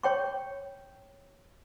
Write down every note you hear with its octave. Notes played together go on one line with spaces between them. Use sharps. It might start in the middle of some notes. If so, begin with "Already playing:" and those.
C#5 G5 C#6